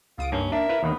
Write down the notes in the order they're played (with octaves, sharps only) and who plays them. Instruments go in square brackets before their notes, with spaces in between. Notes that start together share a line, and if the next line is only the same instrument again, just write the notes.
[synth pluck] C#2 D#6 D7 [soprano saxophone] F4
[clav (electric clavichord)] G2 [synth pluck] A#3 D#4 [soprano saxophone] C#4
[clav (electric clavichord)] D4 [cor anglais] A#4 [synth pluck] D5 [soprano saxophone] E5
[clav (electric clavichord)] E4 B4 F5
[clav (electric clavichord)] D#2 D#3 [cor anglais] B3